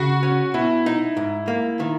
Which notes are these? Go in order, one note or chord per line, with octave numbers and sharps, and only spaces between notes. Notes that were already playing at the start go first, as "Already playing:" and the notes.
Already playing: C#3 F#4
C#4
B2 E4
D#4
G#2
A#3
D#3